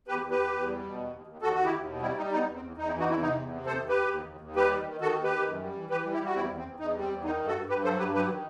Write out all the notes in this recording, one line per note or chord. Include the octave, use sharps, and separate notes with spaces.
E2 G4 B4
E2
G4 B4
E2
E2
G3
B2
D#2
D#2
D#2
D#2 F#4 A4
D#2 F#4
E4 G4
D#2
B2
G3 C4 E4
G3 D#4
E2 D#4
E2
C4
E2
E2 D#4
C4 E4
E3
D#4 F#4
E2 C4 E4
C3 D#4
E2
C3
D#2 A4 C5
D#2
G4 B4
D#2
D#2
D#2
D#2
G3 G4 B4
D#3
D#3
D#3 F#4 A4
D#2
G4 B4
D#3
F#2
G3
E3
E3 G4 B4
G3
E4 G4
G3 F#4
E2 C4 E4
E2
C4
E2
E2 D#4
G3
C4
E2
D#3 D#4
G2
F#4 A4
G2
G2 G4 B4
F#3 A4 C5
G2 G4 B4
F#3 G4 B4
D#3